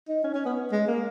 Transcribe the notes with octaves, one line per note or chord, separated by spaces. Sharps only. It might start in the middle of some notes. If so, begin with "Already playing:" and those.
D#4
C#4
C#4
B3
G#3
A#3